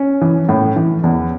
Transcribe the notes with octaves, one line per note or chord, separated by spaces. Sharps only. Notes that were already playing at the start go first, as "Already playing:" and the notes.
Already playing: C#4
E3
A2
E3
E2